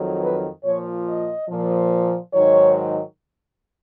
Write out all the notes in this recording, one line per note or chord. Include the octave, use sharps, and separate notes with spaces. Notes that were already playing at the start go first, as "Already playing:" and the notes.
Already playing: F2 D#3 F#3
B4
A#2 F3 C#5
D#5
A#2 F3
G#2 D#3 F#3 C#5